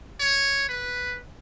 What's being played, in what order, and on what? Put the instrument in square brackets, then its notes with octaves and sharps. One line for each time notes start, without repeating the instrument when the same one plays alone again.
[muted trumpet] C#5
B4